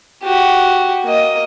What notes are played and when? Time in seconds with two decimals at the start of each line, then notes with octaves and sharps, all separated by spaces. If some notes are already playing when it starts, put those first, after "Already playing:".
0.24 F#4 G4
1.04 A#3 D#5